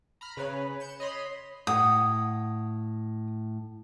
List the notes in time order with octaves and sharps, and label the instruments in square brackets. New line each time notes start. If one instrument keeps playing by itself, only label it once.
[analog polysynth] A#5 B5 F6
[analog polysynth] C#3 B4 [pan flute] C#5
[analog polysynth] G6 C#7 E7
[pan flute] C#5 [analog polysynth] D#5 B5 C6
[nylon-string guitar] A2 F#5 [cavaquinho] D#6